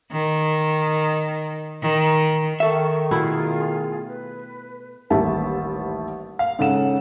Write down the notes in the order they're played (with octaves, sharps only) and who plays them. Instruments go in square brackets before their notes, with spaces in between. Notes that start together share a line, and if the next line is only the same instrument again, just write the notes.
[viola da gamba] D#3
D#3
[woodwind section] D#3 [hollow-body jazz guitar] A4 E5 [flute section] C#6
[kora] B2 A3 E4 [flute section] F4 G#4
[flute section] B4
[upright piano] A1 D#2 G3 E5 A5
F5
G#2 C#3 C#4 A4 F#5 E7